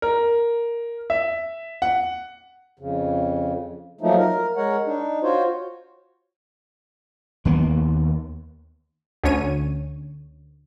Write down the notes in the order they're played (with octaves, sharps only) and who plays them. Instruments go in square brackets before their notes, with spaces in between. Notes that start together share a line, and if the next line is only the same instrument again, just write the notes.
[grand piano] A#4
E5
F#5
[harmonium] F2 C#3
F3 F#3 A3 A#3 D#4
A#4
G#3 A#4 C#5 F#5
D4 D#4
F4 F#4 C5 C#5
[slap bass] D#2 A#3 B3
[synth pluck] D2 D3 C#4 C#5 D#7